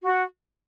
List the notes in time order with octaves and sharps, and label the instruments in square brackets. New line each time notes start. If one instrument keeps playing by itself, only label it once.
[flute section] F#4